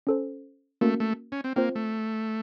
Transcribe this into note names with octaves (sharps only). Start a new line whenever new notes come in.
C#4 A4 C5
A3 A#3 C#4 F#4 A#4
A3
C#4
C4
A#3 C4 F4 C5
A3